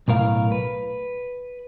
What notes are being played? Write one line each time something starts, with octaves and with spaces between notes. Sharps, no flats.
B1 A2 A#4 F5
B4